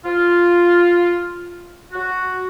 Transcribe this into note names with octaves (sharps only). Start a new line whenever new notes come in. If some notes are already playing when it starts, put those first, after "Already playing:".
F4
F#4